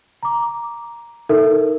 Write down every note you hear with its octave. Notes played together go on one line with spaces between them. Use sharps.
A#5 D6
D#4 A4 A#4 E5